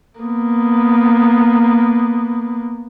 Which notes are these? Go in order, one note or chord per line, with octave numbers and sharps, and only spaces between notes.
A#3 B3